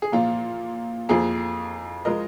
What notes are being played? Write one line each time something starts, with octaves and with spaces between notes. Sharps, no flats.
G#4
A#2 F3 A#3 F4
F2 F3 A#3 G#4
F3 G#3 A#4 D#5